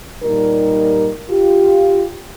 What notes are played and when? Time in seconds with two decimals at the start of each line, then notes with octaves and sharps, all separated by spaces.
0.22 A#2 G3 D#4 A#4
1.29 F4 G4